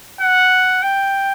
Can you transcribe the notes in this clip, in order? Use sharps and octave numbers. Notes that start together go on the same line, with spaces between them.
F#5
G5